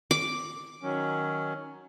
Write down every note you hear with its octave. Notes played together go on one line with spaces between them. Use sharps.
D6
D#3 F#3 C#4